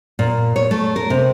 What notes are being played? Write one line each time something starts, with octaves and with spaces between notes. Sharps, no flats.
A#2
C#5
A3
A#4
C3